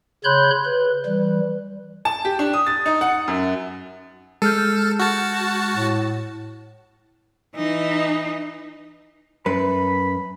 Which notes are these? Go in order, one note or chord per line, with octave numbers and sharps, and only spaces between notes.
C#3 C#5 B5 C6 F#6 G6
B4
E3 G3
A5
G4
D4
D#6
A6
D#4
F#5
F#2
G#3 A4 F6 G6
F#4 A5
A2
E3 D#4
F#2 B4 B5